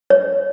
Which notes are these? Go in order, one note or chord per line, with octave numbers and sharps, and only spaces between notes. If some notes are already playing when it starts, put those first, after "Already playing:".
C#5